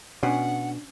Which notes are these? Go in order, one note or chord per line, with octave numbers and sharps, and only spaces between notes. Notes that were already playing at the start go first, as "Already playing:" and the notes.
B2 C#4 D4 F#5